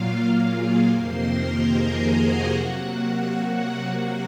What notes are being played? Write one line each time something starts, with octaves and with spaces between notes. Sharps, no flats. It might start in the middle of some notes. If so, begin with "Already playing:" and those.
Already playing: A#2 F#3 A#3 F4 F5
G#4 G#5
F2 C3 D#3 A#3 C5 C6
A#4 A#5
G#4 G#5
F#4 F#5
C3 F#3 A#3